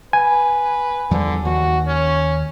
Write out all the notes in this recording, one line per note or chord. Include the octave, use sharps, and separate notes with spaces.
B4 G#5
E2 D3 F3 G3
D#2 F#4
C#4